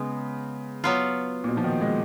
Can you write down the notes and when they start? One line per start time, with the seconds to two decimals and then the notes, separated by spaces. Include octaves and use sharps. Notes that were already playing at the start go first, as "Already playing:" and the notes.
Already playing: C#3 G#3 B3
0.84 F#3 B3 F4
1.44 A#2
1.48 B2
1.57 F3
1.64 D#3
1.81 G#3